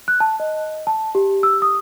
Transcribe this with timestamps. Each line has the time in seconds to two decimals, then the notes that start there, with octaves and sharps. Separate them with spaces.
0.08 F#6
0.20 A5
0.40 D#5
0.87 A5
1.15 G4
1.43 E6
1.62 D#6